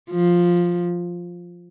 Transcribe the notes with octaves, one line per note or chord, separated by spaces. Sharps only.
F3